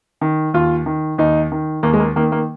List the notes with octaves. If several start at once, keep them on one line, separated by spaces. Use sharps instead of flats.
D#3
D#2 F4
D#3
D#2 D#4
D#3
D#2 A#3
G#3
A#3
D#3 A#3
A#3